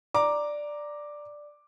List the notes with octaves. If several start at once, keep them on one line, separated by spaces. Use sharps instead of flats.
D5 A#5 D6